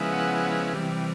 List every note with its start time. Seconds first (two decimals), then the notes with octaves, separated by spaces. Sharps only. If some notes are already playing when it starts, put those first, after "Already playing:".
Already playing: C#3 F3 G#3 B3 E4
0.11 F#5
0.73 C3 E3 G3